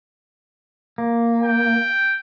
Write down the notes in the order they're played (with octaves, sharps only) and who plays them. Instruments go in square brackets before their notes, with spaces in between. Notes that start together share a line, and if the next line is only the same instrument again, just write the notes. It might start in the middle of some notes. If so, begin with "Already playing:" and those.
[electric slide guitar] A#3
[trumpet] G5